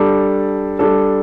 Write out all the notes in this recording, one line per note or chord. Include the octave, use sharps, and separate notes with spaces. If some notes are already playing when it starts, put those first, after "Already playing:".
Already playing: G3 D4 A4
G3 D4 A4